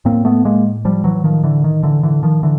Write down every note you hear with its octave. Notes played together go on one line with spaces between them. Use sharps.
A2 A#3 C4
A3 B3
G#3 A#3
F3 G3
E3 F#3
D#3 F3
D3 E3
D#3
D3 E3
D3 E3
D#3 F3
D3 E3